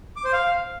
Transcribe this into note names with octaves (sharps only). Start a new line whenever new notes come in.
D6
C5
F5